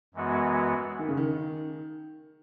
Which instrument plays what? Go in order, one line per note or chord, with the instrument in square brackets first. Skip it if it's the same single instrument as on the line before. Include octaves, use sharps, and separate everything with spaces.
[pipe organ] F#2 E3 G#3 B3 F#4
[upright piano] D#3
C#3
D#3